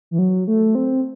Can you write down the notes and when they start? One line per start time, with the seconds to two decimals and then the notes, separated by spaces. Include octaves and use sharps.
0.11 E3
0.18 F#3
0.47 A3
0.75 C4